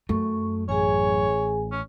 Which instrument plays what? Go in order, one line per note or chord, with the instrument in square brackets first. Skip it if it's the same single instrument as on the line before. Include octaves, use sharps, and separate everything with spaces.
[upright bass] F#2 [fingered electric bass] A3 [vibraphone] C#6
[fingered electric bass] A1 [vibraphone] G#4 G#5 [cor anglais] C#5
[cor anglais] C#4